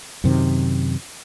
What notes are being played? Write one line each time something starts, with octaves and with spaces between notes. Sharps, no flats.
F#2 C3 D#3